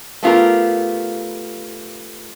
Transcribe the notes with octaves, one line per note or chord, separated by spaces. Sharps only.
A3 B3 F4 G4 A#4